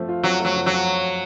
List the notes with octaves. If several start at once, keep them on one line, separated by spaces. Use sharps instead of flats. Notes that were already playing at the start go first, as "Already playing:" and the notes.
Already playing: F3 A3 C4
F4
F#3 C4
F#3 A3
F3
F#3 F4